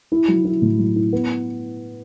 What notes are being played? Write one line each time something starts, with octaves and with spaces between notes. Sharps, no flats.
E4
F#3
E4
A2
F#3
E4
B3